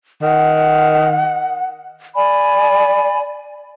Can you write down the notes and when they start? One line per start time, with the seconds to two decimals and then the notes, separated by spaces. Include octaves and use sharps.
0.22 D#3 F#5
2.15 D5 G#5 B5